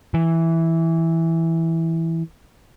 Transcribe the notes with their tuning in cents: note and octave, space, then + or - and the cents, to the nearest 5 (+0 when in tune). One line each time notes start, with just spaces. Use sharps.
E3 -5